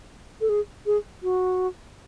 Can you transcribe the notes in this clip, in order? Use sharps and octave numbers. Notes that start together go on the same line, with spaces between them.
A4
G#4
G#4
F#4